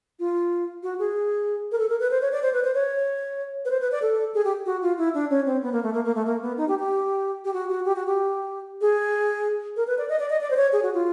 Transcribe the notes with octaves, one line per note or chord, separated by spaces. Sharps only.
F4
F#4
G#4
A#4
A4
A#4
B4
C5
C#5
D5
C5
B4
C5
C#5
B4
C5
B4
D5
A4
G#4
G4
F#4
F4
E4
D4
C#4
C4
B3
A#3
A3
A#3
A#3
A3
A#3
B3
D#4
G4
G4
G4
F#4
F#4
G4
F#4
G4
G#4
A#4
B4
D5
D#5
D5
D#5
D5
C5
C#5
G#4
F#4
F4